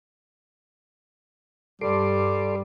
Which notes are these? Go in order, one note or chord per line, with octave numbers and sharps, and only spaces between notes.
G2 G3 A4 C6 D6